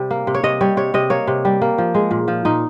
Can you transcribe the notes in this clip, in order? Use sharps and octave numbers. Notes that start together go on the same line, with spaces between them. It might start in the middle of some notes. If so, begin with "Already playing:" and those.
Already playing: C3 G3
A#3
C3
C#5
C3 D#5
G3 C#5
C3 C#5
C3 D#5
A#3 C#5
C3
G3
A#3
F3
G#3
A#2
F3
A#2 D#4